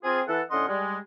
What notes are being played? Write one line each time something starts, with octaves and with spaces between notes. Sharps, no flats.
C4 F4 G#4
E3 A4 F#5
A2 D3 C#4 D#5 F#5 C6
G3 G#3